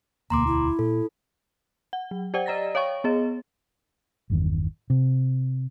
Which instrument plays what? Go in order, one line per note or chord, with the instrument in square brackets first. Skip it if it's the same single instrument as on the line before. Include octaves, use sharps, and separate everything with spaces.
[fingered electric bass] E1 D2 B2 [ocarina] A#3 [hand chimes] A#5 C6 D6
[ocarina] E4
[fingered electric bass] A#2 [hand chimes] A4
[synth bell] F#5
F#3
G4 C5 D5 F#5 G5
D5 D#5 A#5 A6 A#6
C#5 F5 G5 C#6
B3 G#4 D#5
[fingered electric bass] G1 E2 D#3
C3